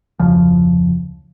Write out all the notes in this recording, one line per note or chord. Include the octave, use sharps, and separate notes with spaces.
F1 D2 C#3 F3